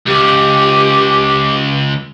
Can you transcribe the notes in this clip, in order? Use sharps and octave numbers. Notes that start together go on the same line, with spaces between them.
C#2 G4